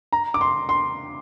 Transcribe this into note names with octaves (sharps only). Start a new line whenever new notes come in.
A#5
D6
C6
C6